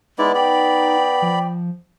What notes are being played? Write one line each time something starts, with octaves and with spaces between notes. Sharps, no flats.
G#3 B3 D#4 E4 D5
D5 G5 B5
F3